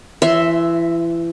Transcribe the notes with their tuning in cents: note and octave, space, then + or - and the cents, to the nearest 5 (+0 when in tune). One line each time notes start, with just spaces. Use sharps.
E3 +30 E5 +0 C6 +0